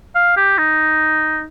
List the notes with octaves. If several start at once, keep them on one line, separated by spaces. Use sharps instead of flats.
F5
G4
D#4